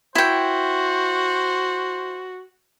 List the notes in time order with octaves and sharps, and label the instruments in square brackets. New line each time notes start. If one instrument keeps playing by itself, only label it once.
[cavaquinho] E4 G5 [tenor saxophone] F#4 [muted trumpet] C5